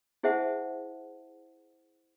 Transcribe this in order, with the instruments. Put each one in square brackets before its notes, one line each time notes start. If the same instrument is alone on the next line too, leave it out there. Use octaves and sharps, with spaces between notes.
[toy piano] E4 G#4 C5 E5 F#5 A5